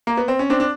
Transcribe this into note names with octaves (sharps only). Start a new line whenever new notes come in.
A#3
B3
C4
C#4
C4 D4
D4